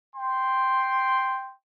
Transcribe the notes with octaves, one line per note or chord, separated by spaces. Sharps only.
G5 C6